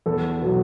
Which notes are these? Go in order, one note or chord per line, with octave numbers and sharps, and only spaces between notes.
E2 A4
B2 F#3